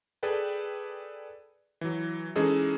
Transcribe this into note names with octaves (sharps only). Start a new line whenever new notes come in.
G#4 A4 B4 D5 G5
E3 F#3
E3 G#3 C#4 D#4 G#4 A4